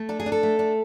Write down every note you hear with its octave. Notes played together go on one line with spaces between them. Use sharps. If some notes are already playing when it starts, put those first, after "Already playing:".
Already playing: A3
D4 A4
G#4
D4
A4
A3
D4